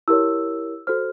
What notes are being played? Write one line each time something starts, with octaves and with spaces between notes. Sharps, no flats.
E4 G4 A#4 C#5 E6
F#4 A4 C5 F6